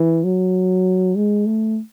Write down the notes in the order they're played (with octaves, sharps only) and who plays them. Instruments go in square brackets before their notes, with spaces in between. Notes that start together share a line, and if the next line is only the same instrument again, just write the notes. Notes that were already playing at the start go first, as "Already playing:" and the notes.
Already playing: [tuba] E3
F#3
G#3
A3